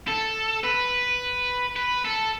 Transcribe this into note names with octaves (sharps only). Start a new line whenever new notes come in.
A4
B4
B4
A4